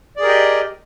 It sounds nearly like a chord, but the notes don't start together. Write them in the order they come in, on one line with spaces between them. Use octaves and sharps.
D5 G#4 A#4 G4 D#5